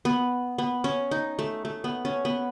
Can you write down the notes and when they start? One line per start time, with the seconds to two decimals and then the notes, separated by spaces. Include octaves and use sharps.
0.05 B3
0.58 B3
0.84 C#4
1.11 D#4
1.39 A3
1.65 A3
1.84 B3
2.05 C#4
2.25 B3